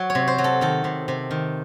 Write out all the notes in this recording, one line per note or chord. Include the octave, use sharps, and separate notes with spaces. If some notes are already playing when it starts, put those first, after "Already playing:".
Already playing: F#3
C#5
C3
C5
F#3
A4
D#3 A4
C3
C3
D#3